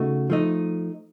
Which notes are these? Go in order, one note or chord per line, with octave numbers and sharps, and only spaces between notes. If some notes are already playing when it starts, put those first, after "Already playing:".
Already playing: C#3 A3 D#4 F#4
F3 A3 D#4